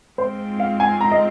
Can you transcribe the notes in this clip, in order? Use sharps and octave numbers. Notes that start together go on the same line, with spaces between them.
G#2 G#3 C4 F4 C5
F5
G#5
A#5
D#5